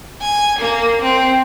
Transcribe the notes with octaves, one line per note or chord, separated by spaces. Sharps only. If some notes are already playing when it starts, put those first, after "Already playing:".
G#5
A#3
C4